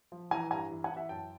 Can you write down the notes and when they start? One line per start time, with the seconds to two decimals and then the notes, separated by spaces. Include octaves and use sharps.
0.12 F3
0.31 E3 G#5 A#5
0.51 G2 G#5 A#5
0.71 E3
0.84 F#5 G#5
0.91 E3
0.96 E5 F#5
1.09 F#2 G5 A5